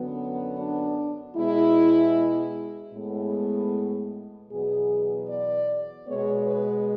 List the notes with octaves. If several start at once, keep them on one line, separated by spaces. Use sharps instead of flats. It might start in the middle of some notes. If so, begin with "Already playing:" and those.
Already playing: F#2 D3 F#3 B3
D4
B2 G#3 B3 E4
A2 G#3 B3
E2 B2 F#3 B3 G#4
D5
B2 G#3 B3 C#5
B4